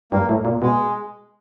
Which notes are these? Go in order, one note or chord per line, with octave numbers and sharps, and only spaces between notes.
G2 A#3
A2
A#2
B2 G#3